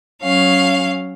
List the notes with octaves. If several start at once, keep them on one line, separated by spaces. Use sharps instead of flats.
F#3 C#4 F5